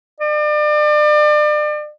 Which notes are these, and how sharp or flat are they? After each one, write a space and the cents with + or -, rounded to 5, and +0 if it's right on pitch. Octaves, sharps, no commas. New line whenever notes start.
D5 +35